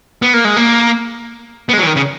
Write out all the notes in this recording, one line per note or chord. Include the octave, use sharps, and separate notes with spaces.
B3
A#3
G#3
A#3
B3
G#3
F#3
E3
D#3
C#3